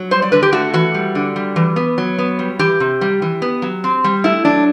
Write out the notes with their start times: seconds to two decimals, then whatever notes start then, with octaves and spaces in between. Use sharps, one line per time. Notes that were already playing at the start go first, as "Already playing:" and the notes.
Already playing: F#3
0.11 G3 C5
0.22 D5
0.32 D3 B4
0.43 G4
0.53 A3 F#4
0.73 E3 F#4
0.94 G3
1.15 D3
1.36 G3
1.56 E3
1.76 B3
1.98 F#3
2.18 B3
2.39 G3
2.59 E3 G4
2.80 C3
3.01 G3
3.22 E3
3.42 B3
3.62 F#3
3.84 C4
4.04 G3
4.24 A3 E4
4.45 F#3 D4